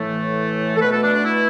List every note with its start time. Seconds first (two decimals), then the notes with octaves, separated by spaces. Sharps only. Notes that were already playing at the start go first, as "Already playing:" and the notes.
Already playing: A2 E3 A3
0.76 A4
0.80 B2 A3 B4
0.91 A4
1.02 D4
1.13 D4
1.24 E4